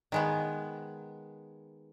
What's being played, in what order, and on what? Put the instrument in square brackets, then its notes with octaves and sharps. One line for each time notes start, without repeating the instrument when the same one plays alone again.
[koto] D#3 G#3 B3